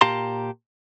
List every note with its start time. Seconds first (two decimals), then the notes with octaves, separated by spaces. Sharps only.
0.01 A#2 G4 F5 A5 A#5 C6